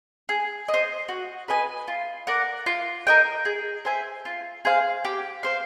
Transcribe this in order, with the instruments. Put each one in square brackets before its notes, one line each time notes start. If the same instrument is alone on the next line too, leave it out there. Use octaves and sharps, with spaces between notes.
[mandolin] G#4
D#5
C5
F#4
B4 D#5 G#5
F4
A#4 D5 F#5
F4
A#4 D#5 G5
G#4
C5 E5 G#5
F4
G#4 C5 F5
G4
C5 F5